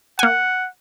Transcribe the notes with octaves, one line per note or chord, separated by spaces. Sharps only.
A#3 F#5 G#5